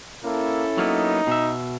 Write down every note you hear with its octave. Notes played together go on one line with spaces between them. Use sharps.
A#3 C#4 E4 A4
F#3 A#3 B3 D#4
B2 E5